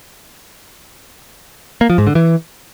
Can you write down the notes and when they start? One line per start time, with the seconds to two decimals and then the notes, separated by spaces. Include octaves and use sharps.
1.81 A#3
1.90 F3
1.98 G#2
2.07 D3
2.15 E3